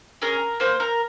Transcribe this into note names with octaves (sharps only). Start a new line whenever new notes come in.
C#4 G#4 A#4
A#3 C5
A#4